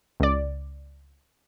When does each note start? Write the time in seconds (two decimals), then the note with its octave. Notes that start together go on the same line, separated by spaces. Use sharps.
0.20 C#2 D5